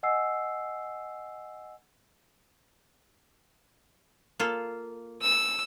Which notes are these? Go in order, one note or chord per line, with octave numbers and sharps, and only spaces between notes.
D#5 F#5 G#5 E6 C7
A#3 F4 A4
E6